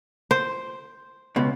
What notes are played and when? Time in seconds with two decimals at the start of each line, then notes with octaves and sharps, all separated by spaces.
0.31 C5
1.36 C#2 B2